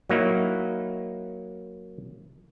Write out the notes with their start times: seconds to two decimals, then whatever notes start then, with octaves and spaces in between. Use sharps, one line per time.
0.10 F#3 A#3 D#4 E4